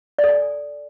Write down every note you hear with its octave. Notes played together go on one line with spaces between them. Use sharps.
D5
A4
G#5